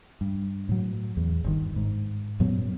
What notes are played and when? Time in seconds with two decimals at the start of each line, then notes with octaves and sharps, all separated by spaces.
0.21 G2
0.69 A2 F#3
1.17 E2
1.44 G1 D#3
1.76 G#2
2.40 F#2 A#2 F#3 B3